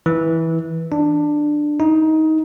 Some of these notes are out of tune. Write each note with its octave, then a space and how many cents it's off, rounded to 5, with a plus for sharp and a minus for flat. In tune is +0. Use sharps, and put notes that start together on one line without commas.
E3 -15
D4 +15
D#4 +20